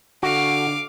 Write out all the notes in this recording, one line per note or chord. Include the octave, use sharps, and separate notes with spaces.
D3 F#4 F5 D6